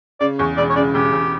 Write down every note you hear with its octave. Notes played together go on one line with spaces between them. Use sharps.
C#3 D5
E2 C#5
E1 D5
C#5
C#3 D5
E1 G4
E1